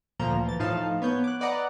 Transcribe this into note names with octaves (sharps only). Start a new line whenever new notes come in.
D2 A#2 F3 A#5 C6
E3 A6
A2 F3 D#4 F5 A5
B3 C#5 G6
D6 F#6
B4 D5 D#5 F#5 A#5